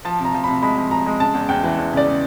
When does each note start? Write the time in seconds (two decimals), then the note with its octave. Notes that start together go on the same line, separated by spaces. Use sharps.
0.05 F3 A5
0.20 C3 A#5
0.34 F3
0.44 C3 B5
0.62 G#3 B5
0.78 F3
0.91 F3 A#5
1.06 G#3
1.20 C#3 A5
1.35 E2
1.49 E2 G5
1.64 E3
1.79 E2
1.93 C#3 D5
2.06 C#3